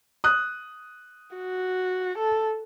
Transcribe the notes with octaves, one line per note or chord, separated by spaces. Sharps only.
D#6 F#6
F#4
A4